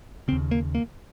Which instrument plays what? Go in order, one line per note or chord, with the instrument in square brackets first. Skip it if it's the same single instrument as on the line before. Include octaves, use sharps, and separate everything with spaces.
[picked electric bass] C#3 C4
D#2
A#3
A#3